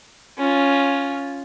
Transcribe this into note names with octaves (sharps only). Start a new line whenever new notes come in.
C#4 F4